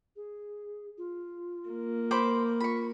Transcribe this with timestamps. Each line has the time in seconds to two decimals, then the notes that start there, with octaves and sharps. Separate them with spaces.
0.16 G#4
0.98 F4
1.70 A#3
2.11 C5 B5 D6
2.60 F4 B5 C#6